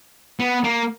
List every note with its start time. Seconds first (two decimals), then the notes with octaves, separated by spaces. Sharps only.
0.40 B3
0.64 A#3